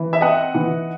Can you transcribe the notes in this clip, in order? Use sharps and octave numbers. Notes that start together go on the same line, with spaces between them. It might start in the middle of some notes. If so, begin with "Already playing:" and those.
Already playing: E3
E5
C4 D#5 F#5
E3